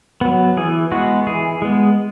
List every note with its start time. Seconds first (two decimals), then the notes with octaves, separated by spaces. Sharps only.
0.21 F#3 B3
0.57 E3 G#4
0.91 G#3 B3 F#4
1.27 E3 G#4
1.62 G#3 B3